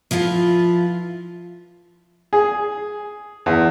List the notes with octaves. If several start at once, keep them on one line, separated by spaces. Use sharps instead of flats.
F3 E4 F4 B4
G#4
E2